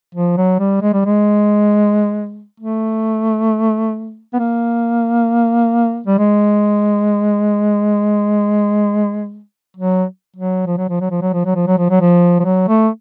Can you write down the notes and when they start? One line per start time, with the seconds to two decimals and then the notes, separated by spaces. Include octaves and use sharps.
0.15 F3
0.37 F#3
0.59 G3
0.82 G#3
0.93 G3
1.05 G#3
2.60 A3
4.33 B3
4.39 A#3
6.07 G3
6.19 G#3
9.77 F#3
10.36 F#3
10.66 F3
10.77 F#3
10.89 F3
11.00 F#3
11.10 F3
11.22 F#3
11.33 F3
11.45 F#3
11.55 F3
11.67 F#3
11.78 F3
11.90 F#3
12.01 F3
12.39 F3
12.45 F#3
12.68 A3